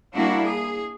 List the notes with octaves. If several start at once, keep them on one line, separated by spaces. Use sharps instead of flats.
G3 A#3 D4 E4 F#4
G#4